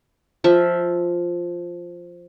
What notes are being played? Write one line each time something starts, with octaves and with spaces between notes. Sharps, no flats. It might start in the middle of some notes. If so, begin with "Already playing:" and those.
F3 E5